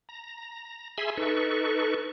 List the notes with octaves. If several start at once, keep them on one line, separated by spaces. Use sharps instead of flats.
A#5
G#4 E5 G#5 B5 C6 E6
D#4 A4 B4 C#6